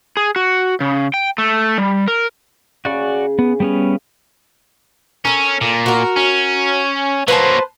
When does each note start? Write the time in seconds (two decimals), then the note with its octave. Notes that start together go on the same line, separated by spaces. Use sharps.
0.17 G#4
0.36 F#4
0.80 C#3
1.14 G5
1.38 A3
1.78 G3
2.08 A#4
2.85 C#3 F#4 D5 C#6
3.39 B3
3.60 G3 B3 C#4
5.25 C#4 A4 A#4
5.61 A#2
5.86 F#4 A#4
6.16 C#4
7.28 F#3 A#3 B4 C5 A5